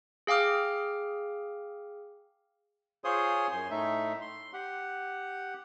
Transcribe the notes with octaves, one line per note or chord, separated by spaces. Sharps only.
G#4 F5 G5 D6 F6
F4 G#4 C5 C#5 C6 D#6
F#2 G#5 C6
A2 A3 D#4 E5
C6
G4 F#5